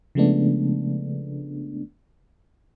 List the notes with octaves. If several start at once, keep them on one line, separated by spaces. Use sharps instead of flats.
C#3 F3 G#3 A3 B3 D4